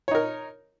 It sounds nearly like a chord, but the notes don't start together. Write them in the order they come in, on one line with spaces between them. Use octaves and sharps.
C#5 D#4 A#4